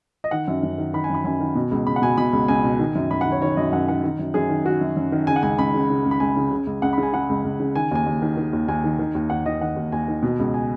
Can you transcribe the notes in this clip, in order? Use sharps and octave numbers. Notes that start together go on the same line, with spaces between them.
D#5
D#3 F#5
F#2
F#2
D#3
D#3 B5
G#5
F#2 B5
F#2 G#5
D#3
B2
C#2
C#2 B5
F#5
B2 G#5
B2 B5
C#2
C#2 G#5
B2
D#3
F#2
F#2 B5
D#3 F#5
C#5
D#3 C#5
F#2 D#5
F#2 F#5
D#3 F#5
D#3
F#2
F#2 G#4
D#3
D#3 F#4
F#2
F#2
D#3
C#3 G#5
F#5
C#2 G#5
C#2 B5
C#3
C#3
C#2
B5
C#2 G#5
C#3
C#3
C#2
C#2 F#5
C#3 B5
G#5
C#3 F#5
C#2
C#2
C#3
D#3 G#5
D#2 G#5
D#2
D#3
D#3
D#2
D#2 G#5
D#3
D#3
D#2
D#2 F#5
D#3 D#5
D#3 F#5
D#2
D#2 G#5
D#3
B2
C#2
G#5